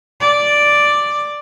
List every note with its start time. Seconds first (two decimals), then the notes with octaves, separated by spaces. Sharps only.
0.20 D5